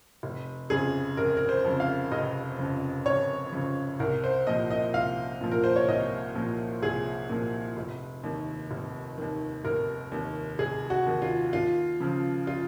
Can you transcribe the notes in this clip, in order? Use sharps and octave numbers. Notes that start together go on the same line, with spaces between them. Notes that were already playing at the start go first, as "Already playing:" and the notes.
F1
F2 C#3 G#4
F1 A#4
A#4
C5
F2 C#3
F5
F1 D#5
F2 C#3
F1 C#5
F2 C#3
C2 A#4
C5
A#2 F3 D#5
D#5
C2 F5
A#2 F3
A#4
C5
C#5
C2 D#5
A#2 F3
C2 G#4
A#2 F3
F1
D#2 D#3
F1
D#2 D#3
F1 A#4
D#2 D#3
F1 G#4
F#4
D#2 D#3
F4
D#2 F4
C#3 F3
F4